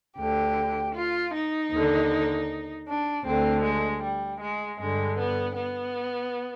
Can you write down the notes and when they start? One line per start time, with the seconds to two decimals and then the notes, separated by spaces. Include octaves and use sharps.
0.17 D2 D3 G4
0.94 F4
1.32 D#4
1.71 D#2 D3
2.87 D4
3.25 D2 D3 C4
3.63 G#3
4.02 G3
4.40 G#3
4.79 G2 D3 G#3
5.18 B3
5.57 B3